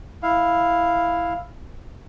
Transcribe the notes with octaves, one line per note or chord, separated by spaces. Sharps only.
E4 F5